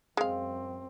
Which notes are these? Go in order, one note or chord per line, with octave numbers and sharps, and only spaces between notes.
F#2 G#3 C4 F5